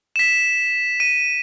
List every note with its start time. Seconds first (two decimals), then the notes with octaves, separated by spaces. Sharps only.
0.16 B6 E7
1.00 D#7